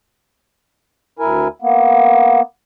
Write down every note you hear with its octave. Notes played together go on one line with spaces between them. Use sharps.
D2 E4 A#4 G#5
A#3 B3